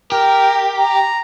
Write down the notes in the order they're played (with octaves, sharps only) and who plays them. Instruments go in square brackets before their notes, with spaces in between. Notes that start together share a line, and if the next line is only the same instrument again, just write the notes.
[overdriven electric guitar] G4 [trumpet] A#4
[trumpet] A#5